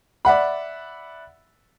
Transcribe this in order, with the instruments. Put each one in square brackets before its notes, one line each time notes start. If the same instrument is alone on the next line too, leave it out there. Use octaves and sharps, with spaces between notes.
[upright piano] D5 E5 F#5 B5